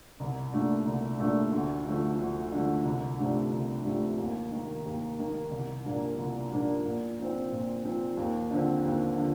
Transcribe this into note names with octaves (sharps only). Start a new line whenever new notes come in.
C2
A#2 A3 D4
C2
A#2 A3 D4
D2
D3 F3 A3
D2
D3 F3 A3
C2
C3 F3 A3 D4
C2
C3 F3 A3 D4
D#2
D#3 A#3
D#2
D#3 A#3
C2
A#2 F3 A#3 D4
C2
A#2 F3 A#3 D4
A#2
F3 C4
A#2
F3 C4
D#2
D3 F3 C4
D#2
D3 F3